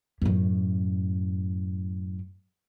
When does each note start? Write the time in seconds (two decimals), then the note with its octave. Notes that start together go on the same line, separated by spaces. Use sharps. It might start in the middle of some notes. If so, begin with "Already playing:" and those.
0.22 F#2 A2